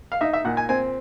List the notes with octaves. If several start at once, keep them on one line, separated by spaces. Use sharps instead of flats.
F5
D#4 E5
E5
A#2 F#5
G#5
C4 G#5